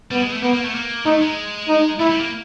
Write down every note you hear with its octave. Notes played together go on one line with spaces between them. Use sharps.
G3 B3
G#3
A3
A#3 B3
A#3
A3
A#3
A3 D#4
G#3
D#4
A3 E4
G3
A#3